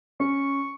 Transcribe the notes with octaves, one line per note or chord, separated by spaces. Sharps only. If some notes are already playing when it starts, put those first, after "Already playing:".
C#4 C#6